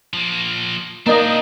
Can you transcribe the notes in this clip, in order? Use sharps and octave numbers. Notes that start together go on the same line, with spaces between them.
F3 A#3
A#3 C4 D4 D#4 D#5